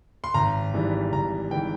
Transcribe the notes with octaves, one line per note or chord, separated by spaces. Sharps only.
C6
G#1 A#5
G#2 E3 G3
G#1 A#5
G#2 E3 G3 G5